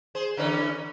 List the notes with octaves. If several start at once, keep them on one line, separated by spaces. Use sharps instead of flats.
G#4 C5
D3 E3 C#4